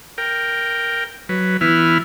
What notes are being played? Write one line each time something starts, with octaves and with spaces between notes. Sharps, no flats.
A#4 G5
F#3 B4
E3 B3 E4 F6